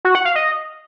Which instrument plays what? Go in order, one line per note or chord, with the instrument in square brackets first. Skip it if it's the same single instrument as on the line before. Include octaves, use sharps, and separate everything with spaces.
[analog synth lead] F#4
F#5
F5
D#5